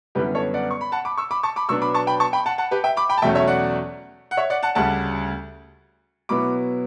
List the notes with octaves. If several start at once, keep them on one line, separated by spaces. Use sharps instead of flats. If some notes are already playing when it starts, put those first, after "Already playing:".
F#2 D3 G3 B3 E4 G4 B4
A4 C#5
D5 F#5
C#6
B5
F#5 A5
B5 D6
C#6 E6
B5 D6
A5 C#6
B5 D6
B2 F#3 B3 D4 C#6 E6
B5 D6
A5 C#6
G5 B5
A5 C#6
G5 B5
F#5 A5
F#5 A5
G4 B4
E5 G5
B5 D6
G5 B5
A5
E2 B2 F#3 A3 C#4 E5 G5
C#5 E5
D5 F#5
F#5
C#5 E5
D5 F#5
F#5 A5
D2 C#3 G3 F#5 A5
B2 F#3 B3 E4 B5 D6